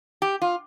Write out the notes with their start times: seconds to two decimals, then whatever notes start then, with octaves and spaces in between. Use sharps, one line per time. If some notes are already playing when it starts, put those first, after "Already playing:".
0.22 G4
0.42 F4